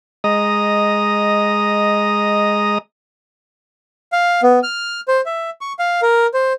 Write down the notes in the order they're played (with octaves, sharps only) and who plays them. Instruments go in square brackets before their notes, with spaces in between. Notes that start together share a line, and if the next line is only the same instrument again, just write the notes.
[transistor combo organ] G#3 D#5 A#5 D#6
[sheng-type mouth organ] F5
B3
F6
C5
E5
C#6
F5
A#4
C5